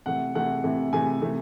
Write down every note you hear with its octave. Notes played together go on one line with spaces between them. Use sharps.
C3 E3 A3 F#5
C3 E3 A3 F#5
C3 E3 A3
C3 E3 A3 G#5
C3 E3 A3